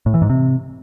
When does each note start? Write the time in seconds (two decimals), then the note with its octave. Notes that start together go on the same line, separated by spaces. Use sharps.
0.06 A2
0.14 E3
0.22 G#2
0.29 C3